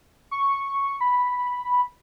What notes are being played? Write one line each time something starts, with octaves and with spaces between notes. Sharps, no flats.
C#6
B5